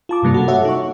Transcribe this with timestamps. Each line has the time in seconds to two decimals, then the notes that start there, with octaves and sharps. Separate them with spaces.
0.09 F4 A5 D6
0.22 G2 C3 G3 A#3 D4
0.34 F#4 A4
0.48 A4 C#5 E5 F#5
0.65 D#4 C#6